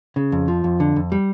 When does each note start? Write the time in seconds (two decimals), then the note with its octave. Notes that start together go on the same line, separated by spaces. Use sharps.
0.16 C#3
0.32 F2
0.48 F3
0.64 F2
0.80 D3
0.96 F2
1.12 G3